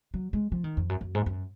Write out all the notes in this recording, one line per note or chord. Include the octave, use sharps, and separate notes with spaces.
F#3
G#3
F3
D#3
F2
F#2
F#2
G#2
F#2